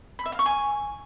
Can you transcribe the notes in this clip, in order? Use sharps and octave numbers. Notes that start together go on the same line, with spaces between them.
B5
E5
F5
C#6
G#5